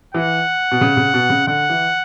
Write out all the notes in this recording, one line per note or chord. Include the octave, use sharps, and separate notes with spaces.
E3 F#5
B2
C#3
C#3
B2
C#3
D3 F#5
E3